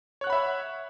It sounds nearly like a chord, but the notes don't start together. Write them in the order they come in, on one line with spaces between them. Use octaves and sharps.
C#5 F#6 F#5 B5 E5